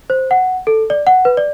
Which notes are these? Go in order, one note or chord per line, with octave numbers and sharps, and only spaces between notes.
C5
F#5
A4
D5
F#5
B4
D5